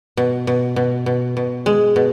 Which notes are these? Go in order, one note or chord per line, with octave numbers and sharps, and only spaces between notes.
B2
B2
B2
B2
B2
G#3
B2